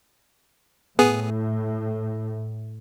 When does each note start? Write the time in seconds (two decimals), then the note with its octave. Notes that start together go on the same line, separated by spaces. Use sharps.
0.99 A2 B3 G#4